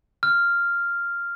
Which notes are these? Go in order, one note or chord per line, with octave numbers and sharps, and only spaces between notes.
F6